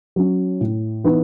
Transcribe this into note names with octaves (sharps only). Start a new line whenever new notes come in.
F#3 C#4
A2
E3 B3 D#4